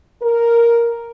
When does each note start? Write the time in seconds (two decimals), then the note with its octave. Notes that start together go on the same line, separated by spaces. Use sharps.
0.21 A#4